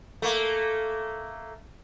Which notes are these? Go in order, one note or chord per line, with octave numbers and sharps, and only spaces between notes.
A3 A#3